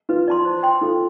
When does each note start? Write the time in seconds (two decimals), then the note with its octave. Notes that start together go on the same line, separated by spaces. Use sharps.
0.09 F4 B4
0.28 D5 A5 C6
0.45 C5
0.63 G5 C6
0.81 F4 A4